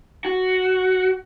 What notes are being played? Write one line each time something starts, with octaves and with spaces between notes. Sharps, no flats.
F#4